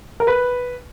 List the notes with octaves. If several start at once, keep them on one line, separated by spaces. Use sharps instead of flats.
A#4
B4